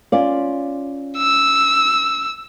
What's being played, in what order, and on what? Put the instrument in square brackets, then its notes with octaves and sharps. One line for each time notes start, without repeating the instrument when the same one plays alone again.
[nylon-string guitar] C#4 F4 D5
[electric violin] E6